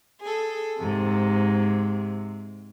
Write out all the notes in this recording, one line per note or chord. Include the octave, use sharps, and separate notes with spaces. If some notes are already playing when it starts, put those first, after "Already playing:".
G#4 A4
G#2 C3